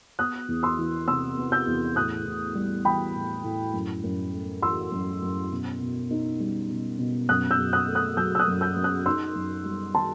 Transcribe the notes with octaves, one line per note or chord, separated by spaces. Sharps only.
B3 D#6 F#6
E2
C6 E6
E3
C3 C6 E6
B3
E6 G6
E2
A2 D#6 F#6
A2
G3
E3 G5 B5
A2
A2
F#2
F#2
A3
E3 C6 E6
F#2
F#2
B2
B2
D#4
G3
B2
B2
F#2 D#6 F#6
E6 G6
F#2
D#6 F#6
A3
D#6 F#6
F#3 E6 G6
E6
D#6 F#6
F#2
E6 G6
F#2
D#6 F#6
D#4 C6 E6
F#2
G3
D#3 A5 C6